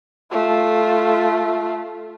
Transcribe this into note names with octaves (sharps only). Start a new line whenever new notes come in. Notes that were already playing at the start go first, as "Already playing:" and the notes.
A3 F4